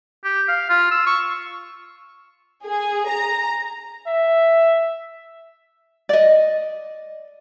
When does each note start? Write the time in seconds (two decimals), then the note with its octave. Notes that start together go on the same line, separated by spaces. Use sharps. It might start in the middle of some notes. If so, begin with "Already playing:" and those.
0.24 G4
0.48 F5
0.70 F4
0.91 E6
1.06 C#6
2.64 G#4
3.09 A#5
4.08 E5
6.09 D5 D#5